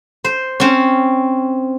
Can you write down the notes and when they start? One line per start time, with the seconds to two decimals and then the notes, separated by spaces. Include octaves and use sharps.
0.24 C5
0.60 C4 C#4